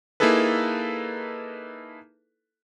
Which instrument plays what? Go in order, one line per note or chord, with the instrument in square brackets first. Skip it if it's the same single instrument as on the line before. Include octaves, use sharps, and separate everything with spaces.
[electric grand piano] A#3 D#4 E4 G#4 A4 B4